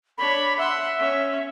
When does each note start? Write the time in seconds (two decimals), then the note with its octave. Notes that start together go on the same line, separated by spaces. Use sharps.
0.18 D4 C#5 B5
0.58 E5 F#5 C6
0.99 C#4 C#5